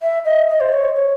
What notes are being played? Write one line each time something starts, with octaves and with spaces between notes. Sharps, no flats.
E5
D#5
D#5
C5
C#5
C#5